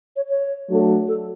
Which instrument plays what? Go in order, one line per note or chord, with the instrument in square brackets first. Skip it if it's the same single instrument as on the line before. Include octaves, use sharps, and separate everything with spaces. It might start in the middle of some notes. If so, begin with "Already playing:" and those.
[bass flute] C#5
C#5
[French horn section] F#3 A3 D4 F#4 A4
[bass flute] A4